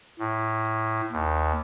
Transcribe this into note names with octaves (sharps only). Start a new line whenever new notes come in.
A2
D#2